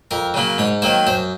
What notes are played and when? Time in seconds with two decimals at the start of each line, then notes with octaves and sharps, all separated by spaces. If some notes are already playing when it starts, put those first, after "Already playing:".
0.11 F2 A#4
0.34 C#3 F#3 A#3
0.58 G#2 C#5
0.82 D#3 F#3 A#3 C5
1.07 F#2 C5